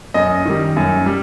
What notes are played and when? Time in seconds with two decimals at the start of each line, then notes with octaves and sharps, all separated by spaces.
0.14 F#2 D#5
0.45 D#3 G3
0.77 F#2
1.06 G3